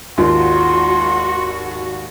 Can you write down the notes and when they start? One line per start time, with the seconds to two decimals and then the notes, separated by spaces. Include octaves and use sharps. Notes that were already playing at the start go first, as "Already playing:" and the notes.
0.18 G#1 D#2 F4 F#4 C6